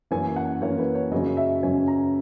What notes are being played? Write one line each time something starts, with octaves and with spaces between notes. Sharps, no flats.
F#2 E3 A#3 C#4 G#5
F#5
F#2 E3 A#3 C#4 C#5
B4
C#5
F#2 C#3 F#3 C#4 D#5
E5
F#2 C#3 F#3 C#4 G#5
A#5